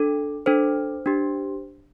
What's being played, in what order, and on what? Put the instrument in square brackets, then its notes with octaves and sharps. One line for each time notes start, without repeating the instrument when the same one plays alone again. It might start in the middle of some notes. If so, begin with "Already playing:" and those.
Already playing: [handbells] D4 A4
D4 A4 C5
D4 G4